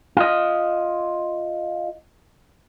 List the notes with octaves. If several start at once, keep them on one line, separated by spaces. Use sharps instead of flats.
F4 D#5